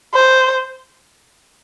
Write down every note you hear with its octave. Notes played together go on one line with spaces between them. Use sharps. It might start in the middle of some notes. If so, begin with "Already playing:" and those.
C5